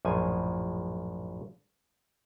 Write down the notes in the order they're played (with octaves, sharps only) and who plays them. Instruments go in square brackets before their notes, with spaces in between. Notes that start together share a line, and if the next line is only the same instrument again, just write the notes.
[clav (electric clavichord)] A#1 F#2 A2 F3 G#5